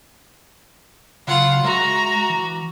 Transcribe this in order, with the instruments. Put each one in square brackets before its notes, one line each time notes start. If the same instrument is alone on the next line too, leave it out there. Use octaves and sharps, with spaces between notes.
[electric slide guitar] C#3 F#3 [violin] F4 F#5
[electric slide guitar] G#3 E5 [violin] F#4 [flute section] A#5
[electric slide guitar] E3